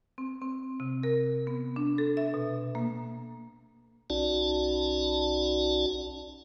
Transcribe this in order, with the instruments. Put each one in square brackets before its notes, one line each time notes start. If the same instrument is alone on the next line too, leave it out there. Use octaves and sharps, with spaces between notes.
[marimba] C4
C4
C3
A#4
B3
D4
A4
E5
B2
A#3
[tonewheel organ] B1 C#4 D#4 F#4 D5 A5